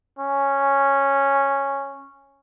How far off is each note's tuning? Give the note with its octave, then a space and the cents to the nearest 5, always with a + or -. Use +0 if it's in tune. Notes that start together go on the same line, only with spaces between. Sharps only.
C#4 -5